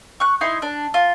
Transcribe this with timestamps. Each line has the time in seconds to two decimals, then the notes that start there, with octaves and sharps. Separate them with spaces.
0.20 C#6 F#6
0.41 D#4 E4 C6
0.62 D4
0.94 F4